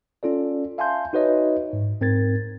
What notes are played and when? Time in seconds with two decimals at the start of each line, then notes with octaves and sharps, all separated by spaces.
0.23 C#4 F4 A4 D5
0.78 E5 F5 G#5 A5 C6 G6
1.13 D#4 F#4 B4 C#5 D#5 E5
1.73 G#2
2.01 G#2 C4 A#4 G#6 A6